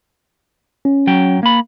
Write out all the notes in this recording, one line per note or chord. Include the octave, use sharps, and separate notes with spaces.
C#4
F#3 G5
A#3 B5